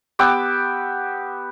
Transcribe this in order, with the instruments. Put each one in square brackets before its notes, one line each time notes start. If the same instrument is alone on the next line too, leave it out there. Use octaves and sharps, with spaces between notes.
[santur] B3 G4 D6 E6